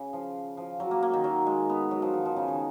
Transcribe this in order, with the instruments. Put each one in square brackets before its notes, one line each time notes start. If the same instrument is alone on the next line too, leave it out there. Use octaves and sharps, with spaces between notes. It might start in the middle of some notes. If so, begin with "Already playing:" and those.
Already playing: [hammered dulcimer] C#3
F3
F3
F#3
A#3
A#3
D#3
F#3
G#3
B3
F#3
F3
D#3
F3
C#3
D#3